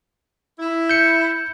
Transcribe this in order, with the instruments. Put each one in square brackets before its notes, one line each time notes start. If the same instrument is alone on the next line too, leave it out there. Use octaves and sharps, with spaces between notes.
[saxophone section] E4
[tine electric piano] G6 C#7